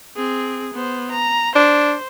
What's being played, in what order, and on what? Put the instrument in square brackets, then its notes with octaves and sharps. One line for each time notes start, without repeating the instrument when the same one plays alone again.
[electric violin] C4 G#4
B3 C5
A#5
[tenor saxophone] D4 [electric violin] C5